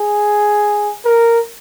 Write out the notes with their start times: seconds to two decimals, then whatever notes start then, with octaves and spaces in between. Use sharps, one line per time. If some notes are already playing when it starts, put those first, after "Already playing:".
Already playing: G#4
1.05 A#4